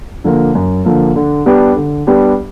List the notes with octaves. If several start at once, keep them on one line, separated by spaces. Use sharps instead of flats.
D3 F3 A#3
F#2
D3 F3 A#3
D3
G3 B3 D4 G4
D3
G3 B3 D4 G4